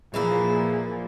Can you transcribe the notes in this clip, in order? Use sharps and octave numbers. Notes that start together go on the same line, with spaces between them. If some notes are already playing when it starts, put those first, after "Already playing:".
A#2 E3 F3 A#3 E4 G#4